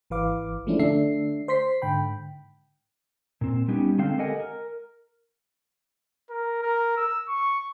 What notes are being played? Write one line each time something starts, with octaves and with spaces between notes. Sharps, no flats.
G#1 E3 B4 F5 D6
F3 G#3 A3 C#4 D4 E4
D3 A3 D4 E5 C7
C5 C6 B6 C7
G#2 D3 G5 B5
A#2 C4
G3 B3 C#4 D#4 G4
D3 G#3 C4 F5 G5
G4 A4 A#4 D#5 F#5 G#5
A#4
A#4
A#4
E6
C#6